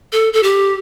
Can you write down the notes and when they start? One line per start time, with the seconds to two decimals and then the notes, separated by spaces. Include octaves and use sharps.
0.12 A4
0.33 A4
0.43 G4